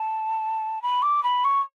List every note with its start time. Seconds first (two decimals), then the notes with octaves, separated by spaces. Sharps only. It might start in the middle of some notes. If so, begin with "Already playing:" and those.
Already playing: A5
0.82 B5
1.02 D6
1.23 B5
1.44 C#6